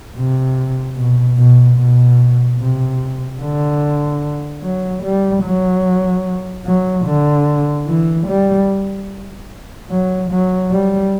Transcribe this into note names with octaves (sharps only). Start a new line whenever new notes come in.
C3
B2
B2
B2
C3
D3
F#3
G3
F#3
F#3
D3
E3
G3
F#3
F#3
G3